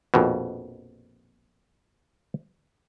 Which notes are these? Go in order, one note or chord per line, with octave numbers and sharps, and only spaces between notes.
A#1 F2 B2